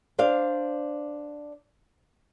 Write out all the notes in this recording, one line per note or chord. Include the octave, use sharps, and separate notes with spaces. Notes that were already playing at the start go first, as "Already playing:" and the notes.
D4 C5 D5 F5